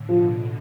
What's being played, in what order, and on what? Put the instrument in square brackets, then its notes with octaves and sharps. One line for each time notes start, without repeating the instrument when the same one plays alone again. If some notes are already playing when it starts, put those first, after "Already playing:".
Already playing: [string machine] A2 D3
[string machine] B2 [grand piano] F3